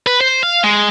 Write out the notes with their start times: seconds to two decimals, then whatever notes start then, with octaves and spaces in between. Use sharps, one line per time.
0.07 B4
0.21 C5
0.43 F5
0.64 G#3